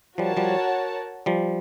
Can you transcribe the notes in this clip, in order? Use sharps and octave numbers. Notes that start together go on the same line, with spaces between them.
F3 G3 F#4 A#4 C#5 F#5 A5
F3 G3
F3 G3